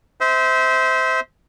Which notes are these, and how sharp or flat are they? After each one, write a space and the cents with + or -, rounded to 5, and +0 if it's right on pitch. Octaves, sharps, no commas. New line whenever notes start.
C5 -15 E5 -35